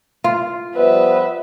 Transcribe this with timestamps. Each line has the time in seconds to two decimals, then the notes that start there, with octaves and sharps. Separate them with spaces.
0.24 F4
0.75 F3 G3 B3 B4 E5